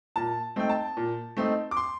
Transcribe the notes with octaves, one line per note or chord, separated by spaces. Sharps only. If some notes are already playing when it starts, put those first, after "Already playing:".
A#2 A5
A3 C4 D#4 G5
A5
A#2
A3 C4 D#4
D6
C6